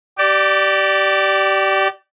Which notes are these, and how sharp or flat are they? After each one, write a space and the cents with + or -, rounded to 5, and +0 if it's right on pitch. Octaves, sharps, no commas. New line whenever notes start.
G4 -25 D5 +5